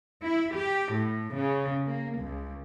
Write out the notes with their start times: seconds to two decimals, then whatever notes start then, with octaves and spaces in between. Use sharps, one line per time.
0.23 E4
0.55 G4
0.95 A2
1.37 C#3
1.86 A#3
2.17 C#2